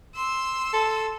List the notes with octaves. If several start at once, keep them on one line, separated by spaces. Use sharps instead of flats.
C6 E6
A4